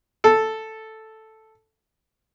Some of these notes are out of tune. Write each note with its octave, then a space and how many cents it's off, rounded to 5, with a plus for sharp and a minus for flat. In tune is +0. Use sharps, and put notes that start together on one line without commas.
A4 +0